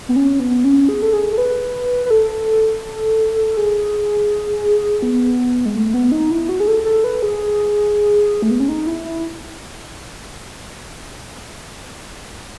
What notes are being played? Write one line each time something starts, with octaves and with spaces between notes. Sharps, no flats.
B3
C#4
B3
C#4
G#4
A4
G#4
A4
B4
B4
A4
G#4
B3
G#3
A3
B3
D#4
E4
F#4
G#4
A4
A4
B4
G#4
A3
B3
C#4
D#4
E4
E4